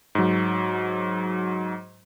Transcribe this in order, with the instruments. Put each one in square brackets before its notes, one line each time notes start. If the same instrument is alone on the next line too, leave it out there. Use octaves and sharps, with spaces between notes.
[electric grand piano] G#2 F#3